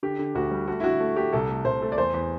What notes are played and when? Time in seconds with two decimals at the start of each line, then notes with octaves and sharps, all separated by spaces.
0.03 D3 G4
0.19 D3
0.35 D2 F#4
0.51 G3
0.67 A3 F#4
0.80 E4
0.84 D3 F#4
1.00 A3
1.16 A3 G4
1.33 C2 A4
1.49 A3
1.65 C2 C5
1.82 A3
1.92 D5
1.98 E2 C5
2.14 E2